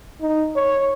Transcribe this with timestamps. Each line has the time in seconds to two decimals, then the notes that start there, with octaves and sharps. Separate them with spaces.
0.22 D#4
0.56 C#5